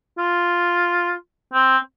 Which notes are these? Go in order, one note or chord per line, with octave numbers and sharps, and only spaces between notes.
F4
C4